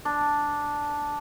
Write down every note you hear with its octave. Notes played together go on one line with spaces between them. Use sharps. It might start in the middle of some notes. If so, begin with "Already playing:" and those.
D4